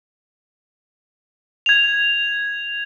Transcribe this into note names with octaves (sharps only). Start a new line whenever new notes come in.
G#6 F7